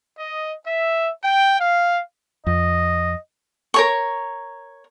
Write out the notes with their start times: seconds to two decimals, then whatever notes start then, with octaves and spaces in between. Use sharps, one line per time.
0.19 D#5
0.68 E5
1.24 G5
1.60 F5
2.47 F2 D#5
3.74 A#4 C#5 C#6